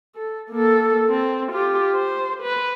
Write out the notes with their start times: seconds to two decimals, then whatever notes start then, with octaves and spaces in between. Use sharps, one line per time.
0.16 A4
0.50 A#3 A4
1.10 C4
1.52 F4 G4
1.95 C5
2.42 B4